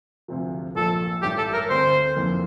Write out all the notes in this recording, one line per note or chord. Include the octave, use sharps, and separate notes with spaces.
D2 C3 F3
A#1 A#2 F3 A4
A1 G2 E3 G4
A4
A#4
D2 D3 A3 C4 C5
F1 F2 E3 A#3